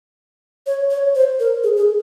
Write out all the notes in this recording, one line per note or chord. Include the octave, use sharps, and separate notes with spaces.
C#5
C#5
C5
A#4
G#4
G#4